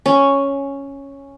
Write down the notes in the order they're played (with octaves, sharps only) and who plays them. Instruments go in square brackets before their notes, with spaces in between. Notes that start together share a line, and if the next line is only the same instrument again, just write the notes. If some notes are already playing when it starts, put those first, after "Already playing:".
[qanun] C#4